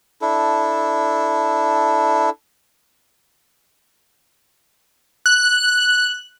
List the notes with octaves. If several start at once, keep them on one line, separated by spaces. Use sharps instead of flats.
D4 E4 A4
F#6